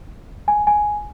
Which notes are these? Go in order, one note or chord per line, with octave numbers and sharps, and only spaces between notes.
G#5
G#5